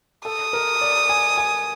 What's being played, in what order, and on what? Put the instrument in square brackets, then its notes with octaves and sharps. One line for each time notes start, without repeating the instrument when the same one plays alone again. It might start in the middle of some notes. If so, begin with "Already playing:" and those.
[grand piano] A4 [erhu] D#6
[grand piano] A#4
D5
G#5
G#5